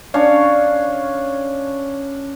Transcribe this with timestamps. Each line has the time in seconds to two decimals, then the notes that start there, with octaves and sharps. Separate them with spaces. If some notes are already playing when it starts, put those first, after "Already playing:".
0.14 C#4 D4 C#5 F5